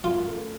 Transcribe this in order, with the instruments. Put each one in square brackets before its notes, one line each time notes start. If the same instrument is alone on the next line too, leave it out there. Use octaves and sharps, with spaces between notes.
[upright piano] F#2 [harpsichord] F4
[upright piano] A3